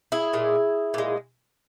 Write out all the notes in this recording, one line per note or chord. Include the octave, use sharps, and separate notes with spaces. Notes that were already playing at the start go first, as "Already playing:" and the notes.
E4 G#4
A#2 G#3
A#2 G#3